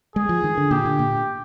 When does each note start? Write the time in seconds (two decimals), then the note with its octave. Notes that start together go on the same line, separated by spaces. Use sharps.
0.16 G#3 G#4
0.29 F3
0.44 D#3
0.58 D3
0.71 A#2 G4
0.85 D3
0.99 A#2